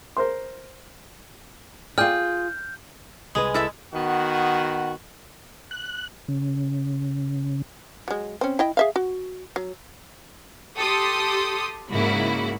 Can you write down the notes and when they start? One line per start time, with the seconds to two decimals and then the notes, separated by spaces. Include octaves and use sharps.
0.17 A#4 C5 C6
1.98 F4 G#4 D5 G5 F6 G6
3.35 C2 G#3 G#4 B4
3.54 E4 A4 E5
3.93 D#3 B3 F#4
5.71 F#6
6.28 C#3
8.08 F#3 G#3
8.41 C4 C#4
8.59 E4 D#5 G5
8.77 G#4 E5 F5
8.96 F#4
9.56 F#3
10.77 G4 A4 C6 D#6
11.91 G#2 C#3 A#3 E4 F#4